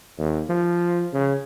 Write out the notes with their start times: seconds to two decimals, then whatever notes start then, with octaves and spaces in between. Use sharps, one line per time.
0.18 D#2
0.49 F3
1.13 C#3